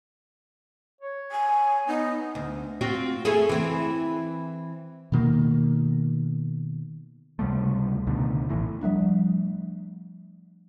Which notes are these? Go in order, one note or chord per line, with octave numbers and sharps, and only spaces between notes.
C#5
G#5
B3 D#4
D2
C4 F4 F#4
A3 E4 G#4
E3 C4 E4
B2 D#3 A#3
C#2 C3 G3 A3
C#2 B2 D3 D#3
A1 A2 E3
F3 G3 A3 D4